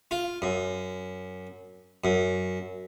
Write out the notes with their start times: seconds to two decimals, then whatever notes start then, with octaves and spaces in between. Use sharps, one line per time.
0.11 F4
0.42 F#2
2.04 F#2